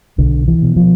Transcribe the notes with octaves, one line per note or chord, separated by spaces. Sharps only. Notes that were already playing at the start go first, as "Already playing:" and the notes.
B1 D3
E3
B2
F3